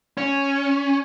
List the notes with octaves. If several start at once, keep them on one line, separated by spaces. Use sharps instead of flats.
C#4